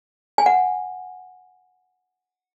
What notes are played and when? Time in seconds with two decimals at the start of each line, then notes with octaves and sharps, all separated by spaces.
0.38 G#5
0.46 F#5